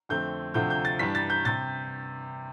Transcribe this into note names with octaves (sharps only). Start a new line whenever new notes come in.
F2 D3 A3 C4 G6
D2 C3 F3 A3 D4 G6
G6
A6
G2 E3 G3 D4 B6
A6
G6
C3 A6